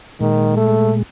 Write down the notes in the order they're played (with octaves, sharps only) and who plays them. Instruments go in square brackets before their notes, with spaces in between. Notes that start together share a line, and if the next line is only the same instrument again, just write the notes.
[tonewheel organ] A#2 G#3 [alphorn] D#3
[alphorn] A3